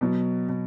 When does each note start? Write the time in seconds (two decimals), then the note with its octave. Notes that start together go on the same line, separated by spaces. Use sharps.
0.01 B2 F#3
0.49 B2